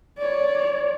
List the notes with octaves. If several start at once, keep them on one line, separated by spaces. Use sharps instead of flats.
C#5 D5